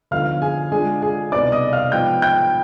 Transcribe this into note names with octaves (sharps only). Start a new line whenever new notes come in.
D2 D3 F3 B3 D#4 F5 F6
G#4 G#5
D3 G#3 D4 F4 G#4 G#5
G#4 G#5
C2 B2 B3 D#4 D5 D6
D#5 D#6
F5 F6
G#2 F3 B3 G5 G6
G5 G6